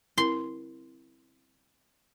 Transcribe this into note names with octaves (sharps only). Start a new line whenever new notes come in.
C4 E4 A#4 C6